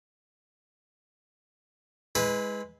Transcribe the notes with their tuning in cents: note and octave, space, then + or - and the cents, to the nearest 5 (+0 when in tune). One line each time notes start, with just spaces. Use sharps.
G#3 +0 E4 -25 B4 +0